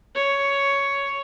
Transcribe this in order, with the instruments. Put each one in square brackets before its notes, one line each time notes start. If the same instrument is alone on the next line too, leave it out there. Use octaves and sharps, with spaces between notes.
[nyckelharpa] C#5